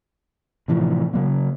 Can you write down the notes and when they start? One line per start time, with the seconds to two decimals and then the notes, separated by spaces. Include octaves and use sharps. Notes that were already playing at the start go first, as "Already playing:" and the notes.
0.68 A2 C3 E3 F3
1.14 C#3 F#3 A#3